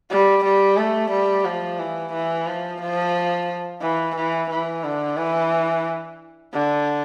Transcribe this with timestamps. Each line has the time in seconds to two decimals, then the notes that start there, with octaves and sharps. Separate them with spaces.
0.10 G3
0.44 G3
0.77 A3
1.11 G3
1.45 F3
1.79 E3
2.13 E3
2.47 F3
2.81 F3
3.82 E3
4.16 E3
4.50 E3
4.84 D3
5.17 E3
6.53 D3